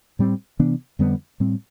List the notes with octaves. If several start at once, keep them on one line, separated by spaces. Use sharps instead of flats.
A2 G3 C4
C3 E3 B3 D4
F2 D3 G3 B3
A2 G3 C4